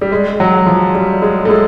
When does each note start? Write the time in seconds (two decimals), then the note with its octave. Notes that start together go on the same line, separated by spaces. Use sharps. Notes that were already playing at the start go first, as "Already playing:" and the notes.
0.01 G3
0.12 G#3
0.40 F#3
0.66 F3
0.94 G3
1.22 G#3
1.45 A3
1.49 G#3